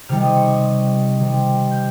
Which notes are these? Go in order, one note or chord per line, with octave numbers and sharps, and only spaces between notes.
C3 D#3 G3 F6
D#6
C#6
D#6
D#6
C3 D#3 G3
F6 G6